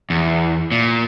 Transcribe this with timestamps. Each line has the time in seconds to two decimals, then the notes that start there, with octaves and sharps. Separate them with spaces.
0.10 E2
0.72 A#2